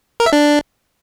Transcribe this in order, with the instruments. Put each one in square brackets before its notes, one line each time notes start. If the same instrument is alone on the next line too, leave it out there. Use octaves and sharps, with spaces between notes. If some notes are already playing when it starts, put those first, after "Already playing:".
[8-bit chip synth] A#4
E5
D4